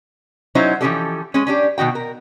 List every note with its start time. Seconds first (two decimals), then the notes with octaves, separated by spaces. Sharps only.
0.55 F#3 C#4 D#4 E4 C5
0.81 E3 F3 G3 C#4 G4 A4
1.34 G#3 C#4
1.47 C#4 D4 G4
1.78 B2 D#3 F#4 G5
1.95 A#4